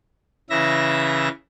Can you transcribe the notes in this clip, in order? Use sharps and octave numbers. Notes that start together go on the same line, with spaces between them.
C#3 E3 E5 A#6